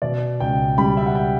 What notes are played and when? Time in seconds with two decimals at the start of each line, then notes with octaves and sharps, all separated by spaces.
0.02 B2 D5
0.40 C#2 G5
0.78 G3 B5
0.97 E5
1.06 F#5
1.15 G5